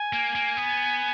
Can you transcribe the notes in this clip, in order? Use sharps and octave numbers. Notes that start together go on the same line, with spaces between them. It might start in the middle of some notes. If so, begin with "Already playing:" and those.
Already playing: G#5
A#3
A#3
B3